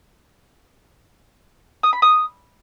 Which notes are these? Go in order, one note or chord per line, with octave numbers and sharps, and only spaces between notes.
D#6
B5
D#6